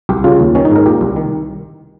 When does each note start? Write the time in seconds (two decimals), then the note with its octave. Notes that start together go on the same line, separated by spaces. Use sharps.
0.09 C2 G4
0.24 C#3 F4
0.40 D#2
0.55 D#3 C#4
0.65 D#4
0.71 G#2 A#4
0.86 A#2 G4
1.01 C2
1.16 D#3